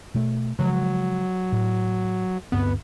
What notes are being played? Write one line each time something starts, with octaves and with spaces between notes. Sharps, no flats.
B2 A3
C#3 F3 F#3 G#3
A2
D2 G2 B3 C4